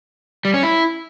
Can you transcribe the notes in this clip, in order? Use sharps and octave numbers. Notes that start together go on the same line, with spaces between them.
G3
C#4
E4